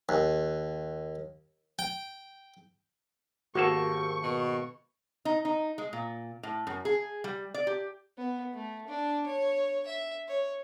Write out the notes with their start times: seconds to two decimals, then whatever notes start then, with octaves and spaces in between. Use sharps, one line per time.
0.09 D#2
1.79 G5
3.55 G#1 A#3 F#4 G4 A4 C#6
4.23 B2
5.25 D#4
5.45 D#4
5.78 G#3
5.93 A#2
6.43 A2
6.67 F#2
6.85 G#4
7.24 G3
7.54 D5
7.67 G4
8.18 B3
8.54 A3
8.87 D4
9.26 C#5
9.87 E5
10.28 C#5